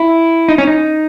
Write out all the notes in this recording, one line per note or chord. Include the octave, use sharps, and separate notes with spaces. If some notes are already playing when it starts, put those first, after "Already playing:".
Already playing: E4
D#4
C#4
D#4